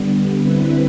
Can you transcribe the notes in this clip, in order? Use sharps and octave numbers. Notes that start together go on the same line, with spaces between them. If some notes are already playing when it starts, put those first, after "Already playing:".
Already playing: D3 G3 B3
D3 G3 C4 E4 B4